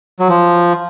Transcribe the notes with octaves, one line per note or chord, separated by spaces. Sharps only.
F#3
F3